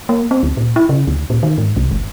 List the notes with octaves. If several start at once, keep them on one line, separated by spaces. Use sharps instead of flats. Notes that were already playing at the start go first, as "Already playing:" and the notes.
A#3
C4
D2
A#2
E4
C#3
D2
A#2
D#3
G#2
C2
G1